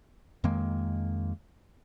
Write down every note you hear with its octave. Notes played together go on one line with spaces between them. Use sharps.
F2 D#3 G#3 A#3